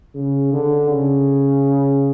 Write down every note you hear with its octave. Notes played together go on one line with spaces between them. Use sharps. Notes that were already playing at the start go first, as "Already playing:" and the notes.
C#3
D3
C#3